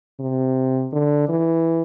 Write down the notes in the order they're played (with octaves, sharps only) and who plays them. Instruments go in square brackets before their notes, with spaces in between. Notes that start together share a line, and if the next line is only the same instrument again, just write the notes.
[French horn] C3
D3
E3